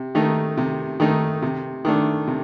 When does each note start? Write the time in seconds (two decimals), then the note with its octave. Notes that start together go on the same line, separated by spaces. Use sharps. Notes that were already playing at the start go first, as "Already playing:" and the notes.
Already playing: C3
0.15 D#3 A3 D#4
0.57 C3
1.00 D#3 A3 D#4
1.42 C3
1.85 D#3 A3 D4
2.28 C3